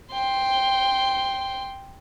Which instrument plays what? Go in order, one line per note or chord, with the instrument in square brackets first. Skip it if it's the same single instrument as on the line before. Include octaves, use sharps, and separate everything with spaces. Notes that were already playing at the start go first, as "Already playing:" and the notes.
[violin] G5 C6